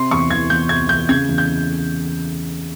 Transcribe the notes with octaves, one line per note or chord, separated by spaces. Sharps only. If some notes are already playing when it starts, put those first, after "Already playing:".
Already playing: C3 C6
E2 C#6
E3 G#6
E2 G6
C3 G#6
E2 G6
C#3 G#6
E2
G6